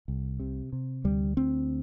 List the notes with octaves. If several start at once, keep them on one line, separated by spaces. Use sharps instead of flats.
C2
C3
C3
D2 G3
D2 C4